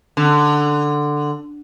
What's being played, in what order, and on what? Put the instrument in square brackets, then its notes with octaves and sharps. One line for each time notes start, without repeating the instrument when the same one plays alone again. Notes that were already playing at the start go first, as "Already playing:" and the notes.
[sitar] D3